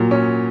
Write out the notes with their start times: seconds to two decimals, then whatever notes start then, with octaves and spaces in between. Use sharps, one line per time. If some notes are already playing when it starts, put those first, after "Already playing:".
Already playing: A#2 F#3
0.11 C#4